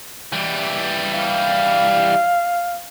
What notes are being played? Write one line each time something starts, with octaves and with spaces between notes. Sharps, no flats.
E3 G3
F5